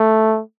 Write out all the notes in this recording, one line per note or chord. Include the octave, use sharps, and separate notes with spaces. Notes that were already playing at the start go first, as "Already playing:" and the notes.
Already playing: A3